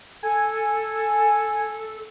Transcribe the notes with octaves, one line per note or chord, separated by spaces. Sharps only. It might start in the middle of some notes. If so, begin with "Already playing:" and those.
A4 G#5